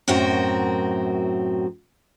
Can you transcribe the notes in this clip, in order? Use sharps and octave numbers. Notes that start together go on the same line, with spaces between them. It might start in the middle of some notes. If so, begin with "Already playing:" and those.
F#2 A2 C4 F#4 A#4